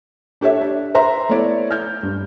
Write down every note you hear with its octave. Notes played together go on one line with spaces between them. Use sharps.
D4 G4 A4 C#5 E5
D4
B4 C5 E5 A#5 C6
A3 B3 E4 C#5 D5
F6 G6
G2